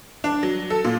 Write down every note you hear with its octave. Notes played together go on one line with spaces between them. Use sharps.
D4
F#3
A4
A#2